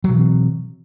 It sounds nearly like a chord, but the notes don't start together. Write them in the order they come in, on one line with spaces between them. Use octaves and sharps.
F#3 B2 E3 C4